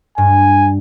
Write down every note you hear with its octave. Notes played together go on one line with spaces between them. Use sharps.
G2 G#5